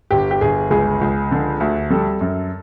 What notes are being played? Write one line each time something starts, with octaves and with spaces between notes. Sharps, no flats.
G1 G4
G4
G1 G#4
C#2 G#4
C#2
D3
D2
G3 A4
F#2